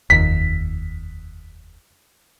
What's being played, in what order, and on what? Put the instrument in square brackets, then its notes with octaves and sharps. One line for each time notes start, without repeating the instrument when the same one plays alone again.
[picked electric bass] F1 D#2 [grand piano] B6